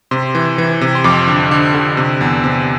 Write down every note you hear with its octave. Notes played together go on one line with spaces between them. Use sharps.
C3 C6
E3
E3
C3
C6
F2 D6
D3
D3
D3
C3
E2
C3